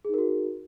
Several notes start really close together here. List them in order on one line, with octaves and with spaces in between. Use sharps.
G#4 D#4 A#4 F#4